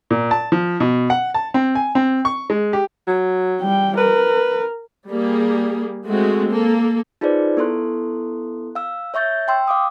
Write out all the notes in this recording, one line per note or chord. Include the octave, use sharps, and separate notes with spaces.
A#2
A5
F3
B2
F#5
A5
C4
G#5
C4
C#6
G#3
G4
F#3
G3 G5
A#4 B4
G3 A#3 G#4
G#3 A3 C4 F#4
A#3 A4
D#4 F4 G#4 B4 C5 D5
B3 E4 A4 C6 F#6
F5 E6
C#5 E5 C#6 G6 A6
G5 C6 E6
F5 D6 D#6